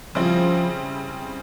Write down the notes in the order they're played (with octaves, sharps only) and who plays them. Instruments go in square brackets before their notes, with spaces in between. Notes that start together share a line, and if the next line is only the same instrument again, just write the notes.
[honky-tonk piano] C#3 G3 C4 E4 [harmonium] F3